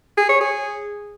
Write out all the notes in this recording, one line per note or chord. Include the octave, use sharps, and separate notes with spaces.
G#4
C#5
G#4